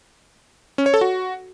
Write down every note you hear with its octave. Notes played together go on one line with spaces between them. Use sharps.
C#4
C#5
A4
F#4